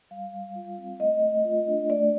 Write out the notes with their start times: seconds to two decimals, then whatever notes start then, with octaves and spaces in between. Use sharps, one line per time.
0.11 G3 F5
0.33 G3
0.55 F4
0.78 C4
1.00 A3 D#5
1.23 A3
1.45 F4
1.67 D4
1.90 A3 D5